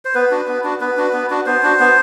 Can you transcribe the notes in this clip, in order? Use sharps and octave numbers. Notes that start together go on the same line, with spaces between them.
C5
B3 B4
D4 F#4
B3
D4 F#4
B3 B4
D4 F#4
B3
D4 F#4
B3 C5
D4 F#4
B3